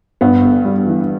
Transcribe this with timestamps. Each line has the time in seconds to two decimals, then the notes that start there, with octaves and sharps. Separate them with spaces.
0.21 G2 B3
0.42 G1
0.65 G3
0.87 E3